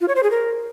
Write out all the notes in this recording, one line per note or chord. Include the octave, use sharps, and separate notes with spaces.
F4
C#5
C5
G#4
A#4